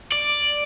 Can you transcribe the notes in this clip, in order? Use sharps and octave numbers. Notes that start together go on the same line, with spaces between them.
D5